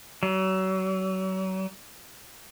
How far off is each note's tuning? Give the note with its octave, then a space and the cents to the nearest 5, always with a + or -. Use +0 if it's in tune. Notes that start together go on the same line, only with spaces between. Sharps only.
F#3 +35